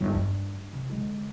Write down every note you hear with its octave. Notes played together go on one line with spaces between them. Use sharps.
G1 D#2
G2
C3
D3 G#3